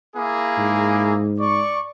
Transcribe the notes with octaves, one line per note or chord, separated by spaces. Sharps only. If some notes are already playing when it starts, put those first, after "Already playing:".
A#3 E4 G#4
G#2
D5 C#6